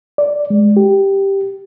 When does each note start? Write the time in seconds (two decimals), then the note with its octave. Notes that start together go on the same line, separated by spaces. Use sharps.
0.18 D5
0.50 G#3
0.77 G4